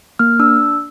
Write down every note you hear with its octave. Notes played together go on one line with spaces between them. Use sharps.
A#3 F6
D4 E6